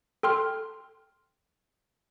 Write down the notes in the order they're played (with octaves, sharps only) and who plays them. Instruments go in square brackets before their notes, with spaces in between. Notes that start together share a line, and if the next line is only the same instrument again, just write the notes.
[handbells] A4 G5 C6 F6